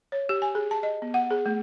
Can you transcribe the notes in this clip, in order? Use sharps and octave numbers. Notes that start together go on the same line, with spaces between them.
C#5
G4
G#5
G#4
A5
D#5
B3
F#5
G#4
A3